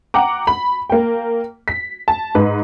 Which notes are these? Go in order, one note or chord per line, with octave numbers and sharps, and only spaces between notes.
F#5 G5 A#5 D6
B5
A#3 G5
B6
A5
G#2 B4